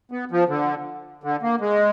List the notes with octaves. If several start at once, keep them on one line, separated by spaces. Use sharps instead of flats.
B3
F3
D3
D3
A#3
G#3